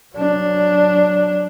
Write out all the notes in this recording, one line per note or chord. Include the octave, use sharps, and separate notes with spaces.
F#3 D4